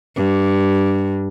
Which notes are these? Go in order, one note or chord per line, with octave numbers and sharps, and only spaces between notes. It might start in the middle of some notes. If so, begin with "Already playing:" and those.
G2